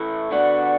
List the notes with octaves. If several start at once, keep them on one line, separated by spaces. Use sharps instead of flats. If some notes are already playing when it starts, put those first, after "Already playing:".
Already playing: A2 E3 A3 E4
D3 B3 F#4 D5 F#5